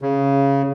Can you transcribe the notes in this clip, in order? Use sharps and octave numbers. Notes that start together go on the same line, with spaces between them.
C#3